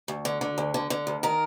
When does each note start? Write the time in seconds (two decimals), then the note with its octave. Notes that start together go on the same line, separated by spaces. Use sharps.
0.08 D2
0.25 D3
0.41 D3
0.58 D2
0.74 D3
0.90 D3
1.07 D2
1.23 D#3 A#4